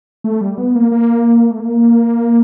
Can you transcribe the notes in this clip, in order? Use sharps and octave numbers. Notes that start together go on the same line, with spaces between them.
A3
G3
B3
A#3
A#3
A3
A#3